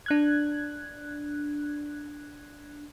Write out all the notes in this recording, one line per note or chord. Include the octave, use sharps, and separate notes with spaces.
D4 F#6 G#6